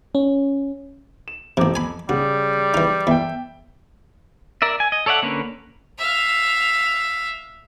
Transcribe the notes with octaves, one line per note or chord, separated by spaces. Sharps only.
C#4
E7
A1 F2 C3 A#5 D6
G#5 B5
C#3 G3 F#4
E3 D#4
E2 E5 G5
A#4 D5 E5
G#5
D#5
A4 C#5 D5 E5 F#5
D3 A#3 C#4 B4
E5 F5